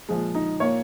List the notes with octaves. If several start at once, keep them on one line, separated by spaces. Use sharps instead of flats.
A#2 F3 G#3
D#4
A#2 A#3 C#5